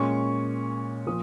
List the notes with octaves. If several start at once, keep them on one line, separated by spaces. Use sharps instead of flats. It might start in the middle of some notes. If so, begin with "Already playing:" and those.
Already playing: A#2 G#3 C#4 C#6
A#2 F3 D#6